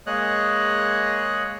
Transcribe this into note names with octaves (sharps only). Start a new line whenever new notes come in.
G#3 A#3 G#4 C#5 D#5 F#6